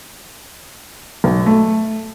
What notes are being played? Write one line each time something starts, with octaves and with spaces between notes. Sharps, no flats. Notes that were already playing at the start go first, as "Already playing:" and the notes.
B1
A3